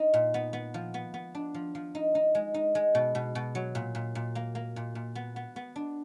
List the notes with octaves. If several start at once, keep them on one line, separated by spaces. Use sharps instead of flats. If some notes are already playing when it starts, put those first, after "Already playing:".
Already playing: D#4
A#2
B3
B3
F3
B3
B3
D4
F3
F3
D#4
D#4
G#3
D#4
G#3
B2
B2
B2
F#3
A#2
A#2
A#2
A#3
A#3
A#2
A#2
B3
B3
B3
D4